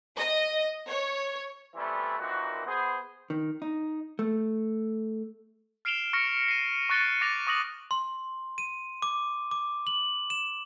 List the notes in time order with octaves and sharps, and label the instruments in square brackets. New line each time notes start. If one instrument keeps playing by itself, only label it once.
[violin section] D#5
C#5
[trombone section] E3 G3 A3 B3 C4 E4
A#2 D#3 E3 C4 F#4
B3 G#4 C5
[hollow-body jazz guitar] D#3
D#4
A3
[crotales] F6 C7 D7 E7 F7 G7
C#6 F6 A#6 C#7 D7
C7 D#7
C#6 F#6 A6 C#7 D#7 G7
D6 A6 A#6 C#7 D#7 F7
C#6 D#6 A#6 F#7
[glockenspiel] C6
D#7
D6
D6
F#7
E7